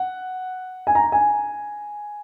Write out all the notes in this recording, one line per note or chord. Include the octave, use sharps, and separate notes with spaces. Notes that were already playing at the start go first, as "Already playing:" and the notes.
Already playing: F#5
G#5
A#5
G#5